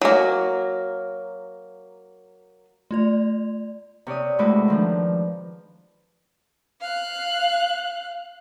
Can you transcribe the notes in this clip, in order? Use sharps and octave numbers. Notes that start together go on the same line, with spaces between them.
F#3 A#3
A3 F4 D5
C3 C#5 D5 D#6
A2 G#3 F#4 B4 D6
D#3 F3 D4
F5 F#6